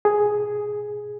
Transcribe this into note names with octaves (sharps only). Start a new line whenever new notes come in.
G#4